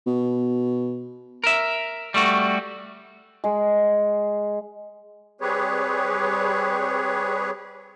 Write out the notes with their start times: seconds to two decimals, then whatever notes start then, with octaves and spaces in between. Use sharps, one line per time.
0.07 B2
1.44 A#4 E5
2.14 G3 A3 F#4
3.44 G#3
5.41 G3 C4 G4 G#4 B4 C#5